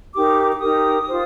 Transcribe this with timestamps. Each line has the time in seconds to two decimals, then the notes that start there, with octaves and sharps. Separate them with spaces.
0.15 D#4 G4 A#4 D6
0.52 D6
0.61 D#4 G4 A#4 D#6
1.07 F4 C5